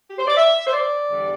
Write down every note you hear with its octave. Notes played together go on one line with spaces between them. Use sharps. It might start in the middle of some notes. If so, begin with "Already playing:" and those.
G4
C5
D5
E5
C5
D5
E2 D3 G3